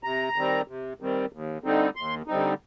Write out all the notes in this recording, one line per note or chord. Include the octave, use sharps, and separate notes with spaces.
C3 A#5
D#3 G3 C4
C3
D#3 G3 C4
D#2
D3 G3 C4 D#4
D#2 C6
D3 G3 C4 D#4